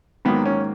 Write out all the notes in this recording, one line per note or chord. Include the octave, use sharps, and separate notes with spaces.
G#2 D#3 F#3 A#3 B3
C#4